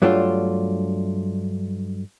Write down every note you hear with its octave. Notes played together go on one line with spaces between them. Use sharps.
G2 F#3 A3 D4 E4 F4